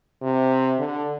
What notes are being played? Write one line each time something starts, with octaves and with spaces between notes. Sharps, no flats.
C3
D3